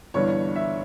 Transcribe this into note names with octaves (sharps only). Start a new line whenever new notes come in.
G1 G2 E3 C#5
E5